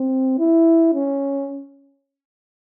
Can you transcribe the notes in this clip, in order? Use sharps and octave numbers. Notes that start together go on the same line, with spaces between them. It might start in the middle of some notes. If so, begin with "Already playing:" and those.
Already playing: C4
E4
C#4